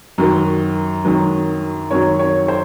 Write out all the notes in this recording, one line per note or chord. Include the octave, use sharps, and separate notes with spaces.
F#2 D#3 F#3
F#2 D#3 F#3
F#2 D#3 F#3 C#5
C#5
C5